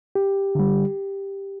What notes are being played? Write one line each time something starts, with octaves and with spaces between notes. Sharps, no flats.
G4
D3 G3